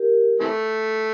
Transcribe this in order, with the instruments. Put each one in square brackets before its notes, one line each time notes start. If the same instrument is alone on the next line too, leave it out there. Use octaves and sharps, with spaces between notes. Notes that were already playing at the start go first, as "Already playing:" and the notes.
Already playing: [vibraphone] G4 A#4
[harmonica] C3 E3 A3